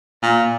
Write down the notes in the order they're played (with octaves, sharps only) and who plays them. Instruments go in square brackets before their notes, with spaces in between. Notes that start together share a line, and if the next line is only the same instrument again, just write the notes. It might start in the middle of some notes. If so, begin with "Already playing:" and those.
[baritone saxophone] A#2